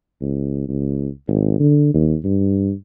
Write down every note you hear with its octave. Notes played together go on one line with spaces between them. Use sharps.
C#2
C#2
G#1
D3
D#2
G2